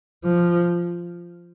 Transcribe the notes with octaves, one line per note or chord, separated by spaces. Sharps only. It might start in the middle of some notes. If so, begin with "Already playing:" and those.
F3